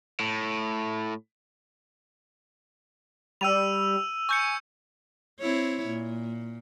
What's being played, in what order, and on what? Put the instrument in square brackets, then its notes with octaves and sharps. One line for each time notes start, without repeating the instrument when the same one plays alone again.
[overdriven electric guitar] A2
[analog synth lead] G3 [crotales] E6 D#7 F7
[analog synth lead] G#5 [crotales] C#6 G6 C#7
[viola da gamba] C4 E4 C#5
A#2